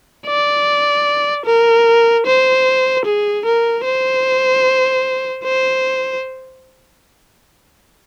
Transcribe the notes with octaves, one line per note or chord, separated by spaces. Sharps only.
D5
A#4
C5
G#4
A#4
C5
C5